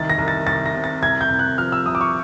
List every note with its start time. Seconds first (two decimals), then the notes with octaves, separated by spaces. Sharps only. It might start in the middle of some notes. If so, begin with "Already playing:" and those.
Already playing: C2 D#3 A6
0.10 A#6
0.18 C2
0.28 A6
0.47 C2 A6
0.66 A#6
0.74 C3
0.84 A6
1.02 C2 G#6
1.21 G6
1.31 C2
1.39 F#6
1.58 F3 F6
1.72 E6
1.86 C2 D#6
1.95 D6
2.01 C#6